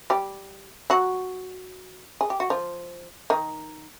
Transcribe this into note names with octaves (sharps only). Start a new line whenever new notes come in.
G3 G4
F#3 F#4
G#4
G4
F#4
F3 F4
D#3 D#4